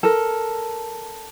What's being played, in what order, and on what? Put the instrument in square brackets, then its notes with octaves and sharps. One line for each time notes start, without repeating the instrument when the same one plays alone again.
[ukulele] A4 A#4